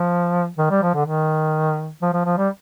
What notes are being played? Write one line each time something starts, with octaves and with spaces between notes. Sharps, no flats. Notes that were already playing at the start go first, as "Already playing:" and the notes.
Already playing: F3
D#3
G3
F3
D3
D#3
F3
F3
F3
G3